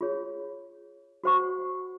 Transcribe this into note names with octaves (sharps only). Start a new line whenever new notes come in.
F4 G#4 C#5
F#4 C5 F#5 C#6